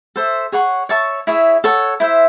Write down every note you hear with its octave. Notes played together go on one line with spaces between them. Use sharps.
A4 C5 E5
G#4 C#5 F#5 C#6
C#5 E5 A5 C#6
E4 G#4 C#5 E5
A4 C#5 F#5
E4 C5 E5